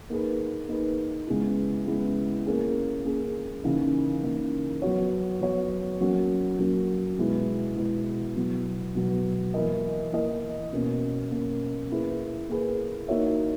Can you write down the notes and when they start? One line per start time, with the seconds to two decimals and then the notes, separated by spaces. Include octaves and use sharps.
0.10 A#3 D#4 G#4 B4
0.68 A#3 D#4 G#4 B4
1.27 C#3 G#3 B3 E4
1.86 C#3 G#3 B3 E4
2.47 A#3 C#4 G#4
3.05 A#3 C#4 G#4
3.64 C#3 E3 A#3 D#4 A#4
4.23 C#3 E3 A#3 D#4 A#4
4.82 F#3 B3 F#4 C#5
5.41 F#3 B3 F#4 C#5
6.00 F#3 A#3 C#4 F#4
6.59 F#3 A#3 C#4 F#4
7.18 B2 G#3 B3 E4 B4
7.76 B2 G#3 B3 E4 B4
8.36 B2 F#3 B3
8.95 B2 F#3 B3
9.54 E3 A#3 E4 A#4 D#5
10.12 E3 A#3 E4 A#4 D#5
10.72 B2 A#3 C#4
11.31 B2 A#3 C#4
11.90 A#3 E4 G#4 B4
12.49 A#3 E4 G#4 B4
13.08 A#3 D#4 F#4 C#5 E5